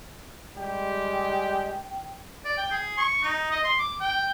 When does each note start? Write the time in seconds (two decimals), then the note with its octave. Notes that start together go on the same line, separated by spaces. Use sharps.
0.57 G3 G#3 G4 G5
2.44 D5
2.57 G5
2.71 G#4
2.97 C#6
3.22 D#4
3.51 D#5
3.64 C6
3.79 D6
4.00 G5